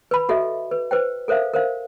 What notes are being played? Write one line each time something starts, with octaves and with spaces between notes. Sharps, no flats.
B4 B5
F#4 A4 D#5 E5
B4
B4 C5 G5
A4 A#4 C5 E5 F5
A#4 C5 F5